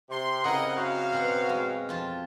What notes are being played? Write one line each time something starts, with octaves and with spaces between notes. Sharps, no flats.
C3 C6
C#3 C4 E4 A#4 D#5 F#5
F#2 F#4 F5
B2 C4 F#5
G#3
F2 F4 A5